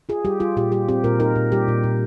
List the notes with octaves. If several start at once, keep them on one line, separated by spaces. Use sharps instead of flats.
F4 G#4
G3 G4
G3 F4
A#2 G4
G3 G4
C4 G4
A#2 A#4
D#4 A#4
A#2
G3 G4
A#2
A#2